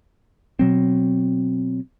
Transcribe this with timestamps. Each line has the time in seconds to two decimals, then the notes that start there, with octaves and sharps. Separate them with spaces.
0.59 B2 F#3 C4